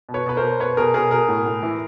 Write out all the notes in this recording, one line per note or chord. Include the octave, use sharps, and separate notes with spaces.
B2
B4 C#5
B2 B4
A#4 C5
B2
B2 B4 C#5
B2 G#4 A#4
B2 G#4 A#4
B2 G#4 A#4
A2
A2
E3